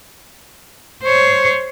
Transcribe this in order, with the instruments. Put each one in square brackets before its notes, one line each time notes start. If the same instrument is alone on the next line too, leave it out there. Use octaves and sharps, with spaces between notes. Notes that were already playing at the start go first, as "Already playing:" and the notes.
[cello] C5 C#5